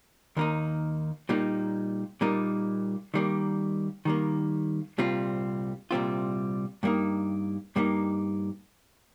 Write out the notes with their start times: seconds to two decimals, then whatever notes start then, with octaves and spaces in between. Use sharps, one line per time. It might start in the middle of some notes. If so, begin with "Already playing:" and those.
0.37 D#2 D#3 A#3 D#4
1.29 A#2 G3 A#3 D#4
2.21 A#2 G3 A#3 D#4
3.14 D#3 G3 A#3
4.05 D#3 G3 A#3
4.98 C2 A#2 G3 C4 F4
5.91 C2 A#2 G3 C4 F4
6.83 G2 G3 A#3 D#4
7.76 G2 G3 A#3 D#4